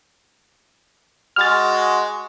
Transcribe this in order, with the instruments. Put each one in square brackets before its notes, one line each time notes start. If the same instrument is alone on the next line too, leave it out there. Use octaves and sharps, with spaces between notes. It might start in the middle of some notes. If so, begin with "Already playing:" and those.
[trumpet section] G#3 F#4 [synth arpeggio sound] F6 A6